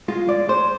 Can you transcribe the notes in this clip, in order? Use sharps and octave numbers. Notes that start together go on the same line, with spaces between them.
G#3 F4
G#3 D5
G#3 C5